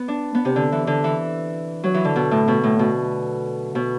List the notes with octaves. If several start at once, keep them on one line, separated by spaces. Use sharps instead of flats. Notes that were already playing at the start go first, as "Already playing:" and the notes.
Already playing: B3
D4
B3
C3
D3
E3
D3
E3
F#3
E3
D3
B2
A2
B2
A2
B2
B2